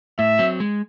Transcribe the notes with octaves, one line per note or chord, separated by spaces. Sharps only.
A2 E5
F#3 C4
G#3